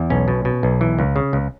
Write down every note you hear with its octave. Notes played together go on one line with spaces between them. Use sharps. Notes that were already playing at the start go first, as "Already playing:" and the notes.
Already playing: E2
B1 C#4
B2
B2
B1
E3
C#2
C#3
C#2